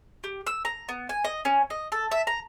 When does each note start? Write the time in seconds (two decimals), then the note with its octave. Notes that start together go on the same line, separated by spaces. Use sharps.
0.24 G4
0.47 E6
0.65 A#5
0.89 B3
1.09 G#5
1.25 D#5
1.45 C#4
1.70 D#5
1.92 A4
2.11 E5
2.27 A#5